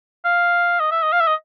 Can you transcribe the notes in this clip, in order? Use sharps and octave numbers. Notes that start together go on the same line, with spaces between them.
F5
D#5
E5
D#5
F5
E5
D#5